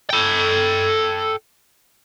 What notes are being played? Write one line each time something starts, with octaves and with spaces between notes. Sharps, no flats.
A4 G5